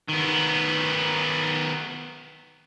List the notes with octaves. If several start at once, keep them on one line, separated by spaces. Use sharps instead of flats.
D#3 B3